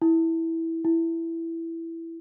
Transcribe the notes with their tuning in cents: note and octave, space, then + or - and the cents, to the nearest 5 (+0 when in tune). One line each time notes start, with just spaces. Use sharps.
E4 -10
E4 +5